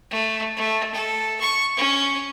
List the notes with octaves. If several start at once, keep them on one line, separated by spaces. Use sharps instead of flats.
A3
A3
A4
C#6
C#4